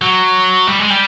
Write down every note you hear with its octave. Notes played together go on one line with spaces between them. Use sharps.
F#3
G3
G#3
G3